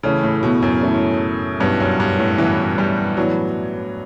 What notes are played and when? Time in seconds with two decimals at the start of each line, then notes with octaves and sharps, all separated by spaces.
0.03 C#3 E3 A3 C#4 E4
0.23 A2
0.43 B2
0.62 F#2
0.83 E3 A3 C#4 E4
1.60 G2 B2 F#3 C#4 E4 B4
1.80 F#2
2.00 G2
2.19 A2
2.38 B2 E3 F#3 C#4 E4 B4
2.78 G3
3.17 A2 E3 F#3 B3 D4